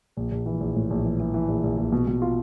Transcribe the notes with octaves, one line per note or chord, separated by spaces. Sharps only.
A#1
A#1
E3
A#1
A2
A#1
E3
E3
E3
A#1
A#1
A#1
B2
B2
F4